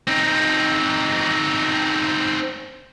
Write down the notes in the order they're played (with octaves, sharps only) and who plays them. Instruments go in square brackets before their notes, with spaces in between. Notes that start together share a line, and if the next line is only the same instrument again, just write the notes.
[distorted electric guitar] C4 D#4